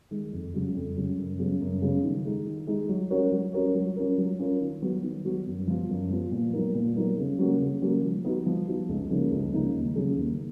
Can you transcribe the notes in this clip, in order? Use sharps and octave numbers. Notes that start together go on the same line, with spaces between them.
D#3 G#3
F2
C#3 F#3
F2
C#3 F#3
F#2
C#3 F#3 B3
F#2
C#3 F#3 B3
D#3
G#3 D#4
D#3
G#3 D#4
F#3
C#4 F#4 A#4 C#5
F#3
C#4 F#4 A#4 C#5
F#3
C#4 F4 A#4
F#3
C#4 F4 A#4
D#3
F#3 B3 F#4
D#3
F#3 B3 F#4
F#2
F3 B3 F4
F#2
F3 B3 F4
A#2
F#3 B3 D#4 A#4
A#2
F#3 B3 D#4 A#4
C#3
F#3 A#3 C#4 F#4
C#3
F#3 A#3 C#4 F#4
F3
B3 D#4 F#4
F3
B3 D#4 F#4
C#2
C#3 F3 A#3 D#4
C#2
C#3 F3 A#3 D#4
D#2
C#3 F#3 C#4 G#4
D#2